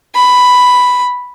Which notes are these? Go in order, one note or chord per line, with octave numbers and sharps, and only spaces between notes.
B5